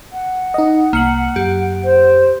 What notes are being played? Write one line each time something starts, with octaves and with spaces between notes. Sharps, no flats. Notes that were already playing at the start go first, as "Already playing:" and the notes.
F#5
D#4 D#5
C2 A#3 C#7 F#7
F#2 G4
C5